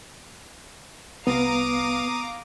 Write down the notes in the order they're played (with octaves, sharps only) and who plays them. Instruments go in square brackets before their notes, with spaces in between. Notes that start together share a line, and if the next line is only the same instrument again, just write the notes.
[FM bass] C2 [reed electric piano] B3 [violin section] F5 A#5 D6 [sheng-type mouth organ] D#6